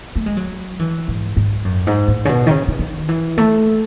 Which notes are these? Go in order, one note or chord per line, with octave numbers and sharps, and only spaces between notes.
A3
G#3
F#3
E3
G#2
G#2
F#2
G#2
A2
C#3
B2
D#3
C#3
C#3
D#3
E3
A3